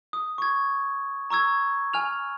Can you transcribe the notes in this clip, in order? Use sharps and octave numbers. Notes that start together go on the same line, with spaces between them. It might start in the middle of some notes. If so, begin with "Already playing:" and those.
D#6
C#6 G#6
A#5 C#6 E6 G#6
G#5 F6 F7